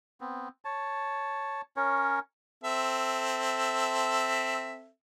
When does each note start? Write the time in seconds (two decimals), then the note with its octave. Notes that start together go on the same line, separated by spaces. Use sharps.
0.21 B3 C4
0.65 C#5 A5
1.77 C#4 A#4 C#5
2.64 C4 A4 E5